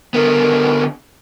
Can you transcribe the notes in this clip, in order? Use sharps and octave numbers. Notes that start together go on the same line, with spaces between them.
D3 B3 A#4